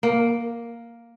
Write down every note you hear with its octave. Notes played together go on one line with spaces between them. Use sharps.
A#3